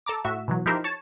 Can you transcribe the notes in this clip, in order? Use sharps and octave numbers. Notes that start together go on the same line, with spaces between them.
A4 A5 A#5 D6
A2 F#4 E5 E7
B2 E3 F#3
F3 D#4 E4 G4 A#4 C5
C#5 A5